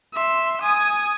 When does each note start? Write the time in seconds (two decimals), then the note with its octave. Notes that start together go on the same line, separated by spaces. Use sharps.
0.14 E5 C6
0.61 G#5 D#6